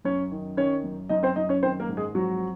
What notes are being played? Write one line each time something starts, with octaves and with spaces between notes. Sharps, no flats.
F#2 C#4 C#5
D#3
D#3 C#4 C#5
F#2
F#2 D#4 D#5
C4 C5
F#2 D#4 D#5
C#4 C#5
D#3 C4 C5
A#3 A#4
G#2
G#3 G#4
F2 F#3 F#4